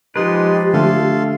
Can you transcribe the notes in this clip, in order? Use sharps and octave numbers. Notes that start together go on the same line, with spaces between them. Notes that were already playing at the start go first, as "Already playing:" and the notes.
F3 G#3 D#4 G4 B4 C6
D3 A3 A4 F5 C6